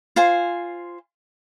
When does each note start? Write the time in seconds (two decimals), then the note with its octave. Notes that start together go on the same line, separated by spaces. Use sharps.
0.16 F4 C5 G#5